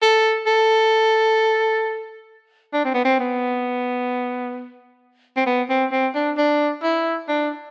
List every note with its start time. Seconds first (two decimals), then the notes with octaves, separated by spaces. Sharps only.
0.02 A4
0.47 A4
2.73 D4
2.85 C4
2.94 B3
3.05 C4
3.19 B3
5.37 C4
5.46 B3
5.70 C4
5.92 C4
6.15 D4
6.38 D4
6.83 E4
7.28 D4